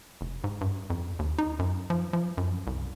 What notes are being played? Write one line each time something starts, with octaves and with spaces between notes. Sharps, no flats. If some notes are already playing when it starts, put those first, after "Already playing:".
F1
G#2
G2
F2
D#2
D#4
F#2
F3
F3
F#2
C2